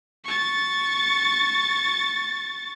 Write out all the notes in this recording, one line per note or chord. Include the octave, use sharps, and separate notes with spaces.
C#6 A6